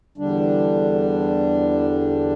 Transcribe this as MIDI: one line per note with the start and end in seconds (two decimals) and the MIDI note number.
0.18 2.34 40
0.18 2.34 50
0.18 2.34 55
0.18 2.34 62